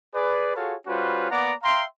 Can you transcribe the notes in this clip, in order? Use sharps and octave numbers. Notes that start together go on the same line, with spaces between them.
G#4 B4 D5
F4 F#4 G#4 A4 C#5 F5
G3 C#4 F4 F#4 B4 C5
A#3 B3 D5 F#5 A#5 D6
E5 F5 G5 A#5 C6